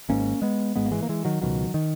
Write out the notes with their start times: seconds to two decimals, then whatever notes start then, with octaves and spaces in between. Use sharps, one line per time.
0.09 G#1 G#2 A#3 C#4
0.42 G#3 B3
0.76 G#1 G#2 G#3 B3
0.86 A#3
0.91 E3 G#3
1.03 A#3
1.09 E3 G#3
1.25 D#3 F#3
1.41 C#2 B2 D#3 F#3
1.74 D#3